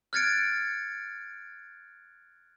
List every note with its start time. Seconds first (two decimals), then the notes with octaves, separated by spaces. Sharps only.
0.13 F6 F#6 G#6 A6 C#7 D7